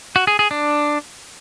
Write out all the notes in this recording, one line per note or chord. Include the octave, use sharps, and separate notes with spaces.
F#4
G#4
G#4
D4